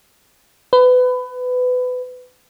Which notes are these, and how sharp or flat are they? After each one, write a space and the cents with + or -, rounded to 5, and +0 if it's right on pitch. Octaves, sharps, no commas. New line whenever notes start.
B4 +25